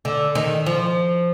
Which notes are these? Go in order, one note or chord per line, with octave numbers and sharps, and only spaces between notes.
D3
D#3
F3